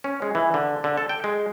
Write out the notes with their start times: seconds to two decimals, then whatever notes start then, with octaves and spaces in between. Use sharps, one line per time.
0.04 C#4
0.22 G#3
0.35 E3
0.54 D3
0.84 D3
0.97 A4
1.09 G5
1.24 G#3